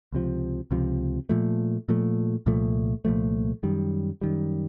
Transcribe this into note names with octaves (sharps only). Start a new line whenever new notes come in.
C#2 C3 F3
C#2 C3 F3
A#2 F3 A3
A#2 F3 A3
C2 A#2 F3 A3
C2 A#2 F3 A3
F#2 D#3 G3
F#2 D#3 G3